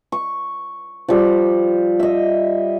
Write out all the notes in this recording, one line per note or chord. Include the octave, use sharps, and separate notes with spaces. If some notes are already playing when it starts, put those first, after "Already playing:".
C#6
F3 G3
D#5 E5